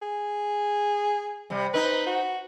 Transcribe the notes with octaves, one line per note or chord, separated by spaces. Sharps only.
G#4
C3 G3
C4 D#4 B4
F#4